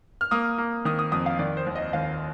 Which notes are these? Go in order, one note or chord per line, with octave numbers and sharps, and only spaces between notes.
F6
A#3 D#6
A#3
D#3 D#6
D#6
F2 D#6
F5
D#3 D5
C5
D#2
D#5
D#2 F5